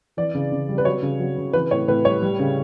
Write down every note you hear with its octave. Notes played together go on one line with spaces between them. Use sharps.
E3 D5
C#3
C#3
G3
B4
F#3 C#5
C#3
F#3
C#3
E3 B4
A2 C#5
A2 B4
G3 C#5
G3
C#3